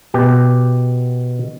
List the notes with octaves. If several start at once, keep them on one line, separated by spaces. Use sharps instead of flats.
B2 G4